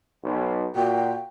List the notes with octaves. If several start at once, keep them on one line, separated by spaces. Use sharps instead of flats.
B1
A#2 F#4 G5